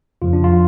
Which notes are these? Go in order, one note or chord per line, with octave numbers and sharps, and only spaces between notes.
F2 C#3 F3 F4
D4
F4